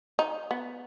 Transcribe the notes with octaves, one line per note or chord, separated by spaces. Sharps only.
D#4
B3